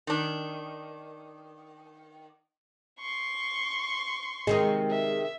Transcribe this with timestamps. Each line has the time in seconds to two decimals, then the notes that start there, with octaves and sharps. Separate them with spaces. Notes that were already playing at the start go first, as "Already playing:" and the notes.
0.07 D#3 D4
3.00 C6 C#6
4.47 C3 D#3 G#3 D#4
4.91 E5